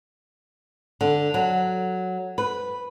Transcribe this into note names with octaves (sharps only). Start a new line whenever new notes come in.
D3
F#3
B4